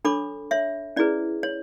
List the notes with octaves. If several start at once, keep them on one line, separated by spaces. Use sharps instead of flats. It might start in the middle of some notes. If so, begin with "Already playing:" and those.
D4 A4 C#5 B5 D6
C#5 E5
C#4 E4 G#4 B4 D5
C#5